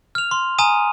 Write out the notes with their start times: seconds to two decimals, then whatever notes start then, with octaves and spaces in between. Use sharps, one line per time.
0.15 F6 F7
0.31 C6
0.58 G#5 A#5 D#6 D#7